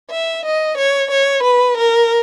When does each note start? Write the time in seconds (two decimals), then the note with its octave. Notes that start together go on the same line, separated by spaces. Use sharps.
0.11 E5
0.45 D#5
0.78 C#5
1.11 C#5
1.44 B4
1.78 A#4